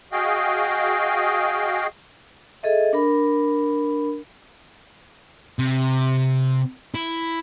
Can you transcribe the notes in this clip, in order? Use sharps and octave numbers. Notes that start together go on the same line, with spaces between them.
F#4 G#4 D#5 F5 G5
G#4 A4 D#5 E5
D4 A#4 B5
C3
E4